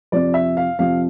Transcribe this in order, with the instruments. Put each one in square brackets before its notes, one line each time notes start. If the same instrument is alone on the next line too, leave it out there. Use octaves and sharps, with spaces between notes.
[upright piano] F2 C3 F3 D5
E5
F5
F2 C3 F3 F5